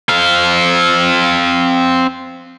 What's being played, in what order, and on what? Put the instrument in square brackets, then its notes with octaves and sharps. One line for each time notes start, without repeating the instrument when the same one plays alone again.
[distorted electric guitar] C4 F5